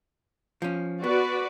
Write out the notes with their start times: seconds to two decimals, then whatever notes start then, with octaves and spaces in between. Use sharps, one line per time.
0.62 F3 C#4
1.04 B3 F#4 B4 D5